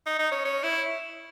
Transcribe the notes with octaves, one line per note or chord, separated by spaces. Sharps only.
D#4
D#4
C#4
C#4
E4